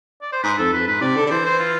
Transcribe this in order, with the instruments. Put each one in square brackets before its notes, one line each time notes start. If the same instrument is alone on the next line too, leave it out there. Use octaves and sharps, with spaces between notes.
[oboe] D5
C5
[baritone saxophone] G#2 [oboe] B4
[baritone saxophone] F2 [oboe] A4
[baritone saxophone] F2 [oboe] B4
[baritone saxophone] G#2 [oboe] B4
[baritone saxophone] C3 [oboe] D5
[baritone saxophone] D3
D3
[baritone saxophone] E3 [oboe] C5
[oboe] C5
F4